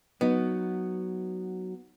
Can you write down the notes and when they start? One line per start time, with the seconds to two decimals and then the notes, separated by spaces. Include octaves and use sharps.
0.21 F#3 B3 D#4